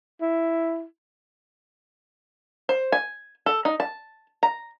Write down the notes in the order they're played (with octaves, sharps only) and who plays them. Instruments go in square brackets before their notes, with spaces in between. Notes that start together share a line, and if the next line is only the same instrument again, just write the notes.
[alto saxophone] E4
[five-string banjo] C5
G#5
A4
D#4
A5
A#5